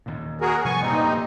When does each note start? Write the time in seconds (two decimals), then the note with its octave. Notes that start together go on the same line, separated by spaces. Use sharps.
0.06 D#2 A#2
0.41 F#4 G#4 A#4
0.64 C3 F3 G3 B3 G#5 C#6
0.81 F1 G2 A#2 G3 C4 D#4